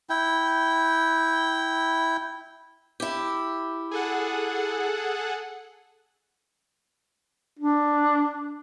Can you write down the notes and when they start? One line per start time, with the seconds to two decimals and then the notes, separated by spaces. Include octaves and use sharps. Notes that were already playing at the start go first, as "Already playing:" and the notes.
0.10 E4 G5
3.00 E4 G4
3.91 G#4 A4 F#5
7.59 D4